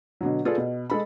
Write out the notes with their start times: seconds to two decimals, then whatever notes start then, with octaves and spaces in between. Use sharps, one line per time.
0.21 B2 D3 F#3
0.45 F4 G#4 A4 B4 D5
0.58 B2
0.90 G#3 A4 B5